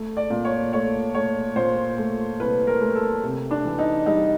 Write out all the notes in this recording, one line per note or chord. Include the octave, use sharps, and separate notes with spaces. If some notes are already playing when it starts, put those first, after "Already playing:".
Already playing: A3
D5
A#2
C#5
A3 C#5
A3 C#5
A#2 C5
A3
C2 B4
A#4
A3
A4
C3
D4
E3
D#4
G3 D#4